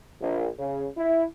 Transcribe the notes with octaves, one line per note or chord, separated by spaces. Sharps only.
A#1
C#3
E4